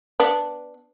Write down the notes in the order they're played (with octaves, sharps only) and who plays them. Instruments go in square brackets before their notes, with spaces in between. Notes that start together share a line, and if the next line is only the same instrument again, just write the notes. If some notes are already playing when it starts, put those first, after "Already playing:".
[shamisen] B3 D4